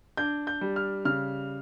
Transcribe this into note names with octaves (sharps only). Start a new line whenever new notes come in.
D4 G6
G6
G3
F6
C#3 F6